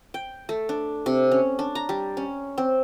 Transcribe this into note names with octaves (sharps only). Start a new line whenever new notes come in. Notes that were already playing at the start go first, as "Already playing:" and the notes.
G5
A3
D4
C3
C#4
D4
A#5
G3
C#4
C4